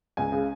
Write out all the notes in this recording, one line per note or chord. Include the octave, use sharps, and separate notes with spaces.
C#2 G#5
C#3